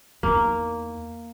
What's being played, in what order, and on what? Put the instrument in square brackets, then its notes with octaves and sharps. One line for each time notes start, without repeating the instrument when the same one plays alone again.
[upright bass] E2 D#4 [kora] A#3